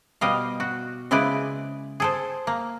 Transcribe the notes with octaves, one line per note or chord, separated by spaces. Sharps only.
B2 G3 D#5 F5
F#4
C#3 G#3 E4 B4 D5
G#4 A4 C5
A#3